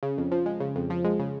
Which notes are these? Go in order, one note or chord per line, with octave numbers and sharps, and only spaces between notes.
C#3
F2
F3
G#3
C#3
F2
F3
G#3
C#3